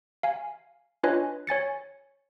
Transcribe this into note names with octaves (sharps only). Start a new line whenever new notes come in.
F5 G#5
D4 F4 B4 C#5 D#5 G#5
C#5 G#5 A6 C#7